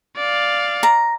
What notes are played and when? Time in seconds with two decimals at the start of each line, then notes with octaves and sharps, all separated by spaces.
0.17 D5 F5
0.83 A#5